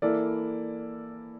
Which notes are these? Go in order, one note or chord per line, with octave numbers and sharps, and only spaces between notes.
E3 A#3 E4 A4 D5